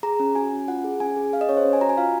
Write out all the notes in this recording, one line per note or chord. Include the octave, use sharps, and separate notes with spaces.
G#4 A#5
C#4
F#4 G#5
C#4
F4 F#5
G#4
C#4 G#5
G#4
G#4 F5
D#5
C#4 C#5
C5
C#4
G#5
F#4 A#5
G#5
F4 F5